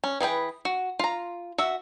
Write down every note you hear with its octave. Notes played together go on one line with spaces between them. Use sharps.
C#4
E3 G#4 B4 G5
F#4
F4 A#5
F#4 E5